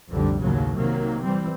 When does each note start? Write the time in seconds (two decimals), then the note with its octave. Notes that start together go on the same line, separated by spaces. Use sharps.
0.10 B1 F2 A2 D3 G3
0.41 D#2 A2 C#3 F#3
0.77 C3 D#3 F#3 A#3
1.23 E3 G3 C4